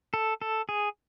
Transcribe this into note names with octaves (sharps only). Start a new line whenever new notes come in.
A4
A4
G#4